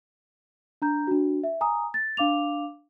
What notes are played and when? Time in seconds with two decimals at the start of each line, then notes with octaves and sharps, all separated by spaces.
0.82 D4 A#5 G6
1.07 D4 F#4
1.43 E5
1.61 G#5 A#5 D#6
1.94 A6
2.17 D4 F5 D6 F7